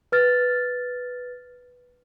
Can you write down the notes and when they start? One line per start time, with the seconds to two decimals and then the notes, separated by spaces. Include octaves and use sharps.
0.12 B4 F6 A6